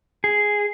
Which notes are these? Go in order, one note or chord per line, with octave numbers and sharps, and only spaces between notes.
G#4